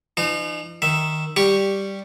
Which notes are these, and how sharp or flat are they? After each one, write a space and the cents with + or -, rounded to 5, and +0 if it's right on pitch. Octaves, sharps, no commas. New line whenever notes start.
E3 +45 D#4 -40
D#3 +0 E5 +0
G3 +0 G4 +0 C#6 +0